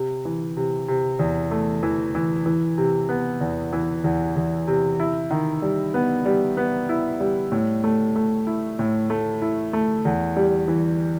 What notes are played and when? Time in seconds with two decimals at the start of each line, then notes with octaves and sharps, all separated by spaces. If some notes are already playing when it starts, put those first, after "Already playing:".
Already playing: C3
0.25 E3
0.57 C3
0.88 C3
1.19 E2
1.51 A3
1.83 E3
2.15 E3
2.46 E3
2.78 C3
3.09 B3
3.41 E2
3.73 E3
4.04 E2
4.36 E2
4.67 C3
5.00 E4
5.31 D#3
5.62 G3
5.94 B3
6.25 G3
6.57 B3
6.89 E4
7.20 G3
7.52 A2
7.84 A3
8.16 A3
8.47 E4
8.79 A2
9.10 A3
9.42 E4
9.73 A3
10.05 E2
10.37 G3
10.68 E3